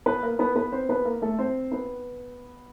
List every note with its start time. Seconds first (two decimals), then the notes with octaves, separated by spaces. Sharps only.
0.06 B3 B4
0.23 A#3 A#4
0.39 B3 B4
0.56 B3 B4
0.72 C4 C5
0.89 B3 B4
1.05 A#3 A#4
1.22 A3 A4
1.39 C4 C5
1.72 B3 B4